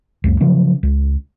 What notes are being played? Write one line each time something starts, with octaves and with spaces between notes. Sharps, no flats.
C#2 F#2
C#3 F3 F#3
C#2